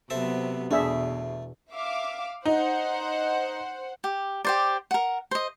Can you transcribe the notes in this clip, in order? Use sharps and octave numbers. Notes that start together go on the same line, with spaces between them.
C3 F#3 B3 C4 A4 E5
E2 B2 A3 D4 G#4 E5
E5 F5 D6
D#4 C5 F#5
G4
G4 C5 D5
A#4 F#5
C5 D#5